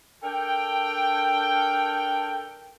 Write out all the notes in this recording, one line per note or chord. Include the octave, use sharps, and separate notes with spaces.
D4 A4 A#4 G5